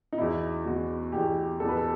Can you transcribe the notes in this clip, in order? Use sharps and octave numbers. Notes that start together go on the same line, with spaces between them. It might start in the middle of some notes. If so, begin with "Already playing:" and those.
D#4
E2 B2 E4
E2 B2 F#4
E2 B2 G4
E2 B2 A4
B4
A4